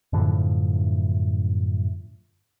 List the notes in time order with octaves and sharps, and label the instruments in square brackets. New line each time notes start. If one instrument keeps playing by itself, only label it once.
[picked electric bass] F#2 A2 D3 F3